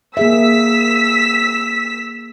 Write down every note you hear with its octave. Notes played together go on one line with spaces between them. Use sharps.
A#3 G#4 E5 E6 B6